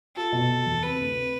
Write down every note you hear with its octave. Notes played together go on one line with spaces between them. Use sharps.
F4 A4
B2
B2
E2
C3 B4
D2
C3